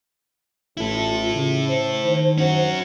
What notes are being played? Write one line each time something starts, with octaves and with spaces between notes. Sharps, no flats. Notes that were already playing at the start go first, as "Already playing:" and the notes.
A1 E4 F4 A4
C#3
C5
D#3
C#4 F#4